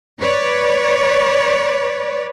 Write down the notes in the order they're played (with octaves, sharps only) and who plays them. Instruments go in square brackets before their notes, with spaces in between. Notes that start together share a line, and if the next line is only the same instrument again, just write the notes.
[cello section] B4 C#5 D5